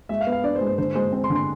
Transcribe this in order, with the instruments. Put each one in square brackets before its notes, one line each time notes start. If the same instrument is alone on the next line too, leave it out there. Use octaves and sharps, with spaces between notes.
[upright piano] G#3 [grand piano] E5
[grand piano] F5
[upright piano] B3
[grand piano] F5
[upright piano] D4 [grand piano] D5
[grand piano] C5
[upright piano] G#3
[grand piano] C5
[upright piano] D3 [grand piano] C5
[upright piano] G#3 [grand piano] C5
[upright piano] C4
[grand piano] C6
[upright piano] D3
[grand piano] C6